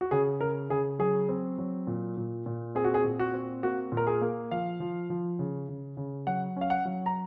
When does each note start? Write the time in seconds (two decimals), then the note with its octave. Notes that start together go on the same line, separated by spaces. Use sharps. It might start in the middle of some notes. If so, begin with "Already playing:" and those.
0.01 F#4
0.11 C#3 G#4
0.41 C#3 A#4
0.70 C#3 G#4
0.99 F#3 G#4
1.29 C4
1.58 F#3
1.87 A#2
2.17 A#2
2.46 A#2
2.75 C4 G#4
2.84 F#4
2.94 G#4
3.04 A#2
3.19 F#4
3.34 C4
3.63 A#3 F#4
3.92 A#2
3.97 A#4
4.07 G#4
4.21 A#3
4.51 F3 F5
4.80 F3
5.10 F3
5.39 C#3
5.69 C#3
5.97 C#3
6.27 F#3 F#5
6.56 C#4 F5
6.70 F#5
6.85 F#3
7.06 A#5